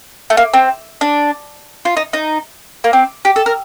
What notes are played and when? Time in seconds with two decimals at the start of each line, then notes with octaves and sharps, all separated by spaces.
0.30 A3
0.37 A#3
0.54 C4
1.01 D4
1.85 F4
1.97 D#4
2.13 D#4
2.84 A#3
2.93 C4
3.25 G4
3.36 A4
3.46 A#4